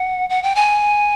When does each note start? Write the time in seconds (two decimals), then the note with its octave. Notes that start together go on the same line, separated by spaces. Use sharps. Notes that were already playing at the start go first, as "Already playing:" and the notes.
Already playing: F#5
0.30 F#5
0.43 G5
0.55 G#5